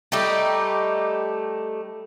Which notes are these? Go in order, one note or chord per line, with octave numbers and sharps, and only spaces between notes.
G3 A3 D#4 G4